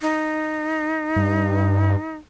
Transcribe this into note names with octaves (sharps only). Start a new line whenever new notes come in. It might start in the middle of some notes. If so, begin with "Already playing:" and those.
D#4
G2